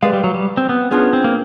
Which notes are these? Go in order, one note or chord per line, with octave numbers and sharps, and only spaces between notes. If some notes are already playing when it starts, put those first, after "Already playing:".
G#3 G4 B4 D5 F5
G3
F#3
G3
C4
B3
B3 C#4 D4 F4 G#4
C4
A#3